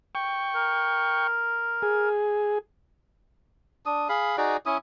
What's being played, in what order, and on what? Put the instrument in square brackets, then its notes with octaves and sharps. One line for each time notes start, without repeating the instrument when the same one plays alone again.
[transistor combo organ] G5 C#6
[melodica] A#4
[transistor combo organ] G#4
[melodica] D4 D#6
G#4 F5 B5
D#4 F#4 G#4 D5
C#4 E4 D#6